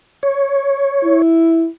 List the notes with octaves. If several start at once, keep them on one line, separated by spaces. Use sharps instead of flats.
C#5
E4